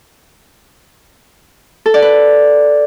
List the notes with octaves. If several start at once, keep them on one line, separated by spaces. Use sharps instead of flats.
A4
D5
B4